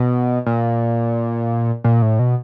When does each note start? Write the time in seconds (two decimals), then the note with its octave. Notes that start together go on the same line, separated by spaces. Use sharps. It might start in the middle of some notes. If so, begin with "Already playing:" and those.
Already playing: B2
0.46 A#2
1.84 A#2
2.02 A2
2.19 B2